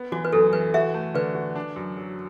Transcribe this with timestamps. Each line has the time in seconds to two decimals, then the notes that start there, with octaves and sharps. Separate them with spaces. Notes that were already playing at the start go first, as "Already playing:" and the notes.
Already playing: B3
0.12 E3 F#4
0.25 B4
0.33 F#2 A4
0.53 E3 B4
0.74 F#4 E5
0.94 A3
1.14 D3 B4
1.35 F#4
1.56 D4
1.76 F#2
1.97 F#3